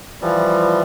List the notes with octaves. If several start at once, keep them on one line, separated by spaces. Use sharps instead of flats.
E3 F3 G3